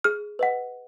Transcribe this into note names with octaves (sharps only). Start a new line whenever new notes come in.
G#4 F6
B4 D#5 F#5